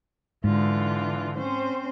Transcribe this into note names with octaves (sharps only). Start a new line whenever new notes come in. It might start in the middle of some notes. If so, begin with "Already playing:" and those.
G#2 D3 E3 F4
C4 C#4 C5